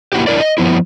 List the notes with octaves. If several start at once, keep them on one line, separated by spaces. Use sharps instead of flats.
A#3 E4 F#4 G4
D4 E4 A#4 D5
D#5
F3 B3 E4